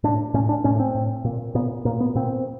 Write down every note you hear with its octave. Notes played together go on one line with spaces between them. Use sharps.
A2 D4
A2 C#4
D4
A2 C#4
C4
A2
A#2
A#2 B3
A#2 A#3
B3
A#2 C4